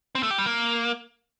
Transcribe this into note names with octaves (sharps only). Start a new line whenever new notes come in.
C4
A3
G4
G3
A#3